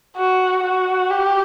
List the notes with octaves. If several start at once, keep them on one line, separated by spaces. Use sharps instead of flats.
F#4
F#4
G4